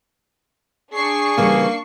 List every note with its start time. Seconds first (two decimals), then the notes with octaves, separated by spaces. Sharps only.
0.94 D4 G#4 C#6 C7
1.38 C#3 E3 G3 A#3